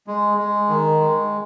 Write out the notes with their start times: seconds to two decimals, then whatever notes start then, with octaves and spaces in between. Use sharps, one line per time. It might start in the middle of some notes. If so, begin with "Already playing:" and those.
0.07 G#3
0.38 G#3
0.69 D#3
1.00 G#3